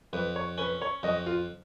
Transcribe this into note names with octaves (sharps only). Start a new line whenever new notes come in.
F2 B4
C#5
C#4 B4
C#5
F2 D#5
F4